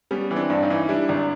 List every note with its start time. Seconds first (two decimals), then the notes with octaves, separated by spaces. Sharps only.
0.11 G3 B3 C#4
0.31 E3
0.36 C4 D4
0.50 G2
0.63 C#4 D#4
0.70 E3
0.89 G3 D4 E4
1.09 G#1